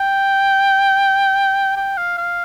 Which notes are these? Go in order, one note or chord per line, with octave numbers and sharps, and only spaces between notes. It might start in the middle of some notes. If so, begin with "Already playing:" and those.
Already playing: G5
G5
F5
F5